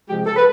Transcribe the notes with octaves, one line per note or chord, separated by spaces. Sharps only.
C3 F3 G#3 G4
A4
B4